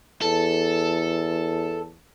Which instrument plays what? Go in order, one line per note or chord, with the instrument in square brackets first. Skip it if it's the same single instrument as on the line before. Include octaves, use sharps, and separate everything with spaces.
[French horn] E2 [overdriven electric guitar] A4